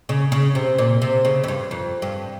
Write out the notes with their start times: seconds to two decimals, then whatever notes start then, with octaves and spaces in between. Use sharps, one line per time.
0.09 C#3
0.32 C#3
0.55 C3
0.78 A#2
1.02 C3
1.25 C#3
1.44 F2
1.48 G2
1.71 F2
2.02 G2